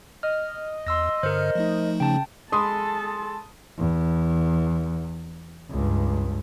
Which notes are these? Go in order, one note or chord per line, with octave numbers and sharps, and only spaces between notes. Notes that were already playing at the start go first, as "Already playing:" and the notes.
D#5 F6
E2 C6 E6 A#6
G2 D3 A#4 C5 F6
F3 A3 D#4
C#3 G5 A5
G#3 A4 A5 B5 C6 D#6
E2
C#2 G2